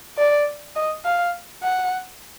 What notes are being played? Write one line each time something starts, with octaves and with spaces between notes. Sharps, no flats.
D5
D#5
F5
F#5